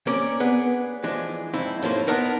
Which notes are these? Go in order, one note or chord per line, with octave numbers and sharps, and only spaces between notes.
A#3 C4 C#4 D5
B3 D4 G#4
E3 F3 G#3 D4
F2 C4 D#4 E4
A2 F3 A#3 C5
B3 D4 D#4 A#4 F#5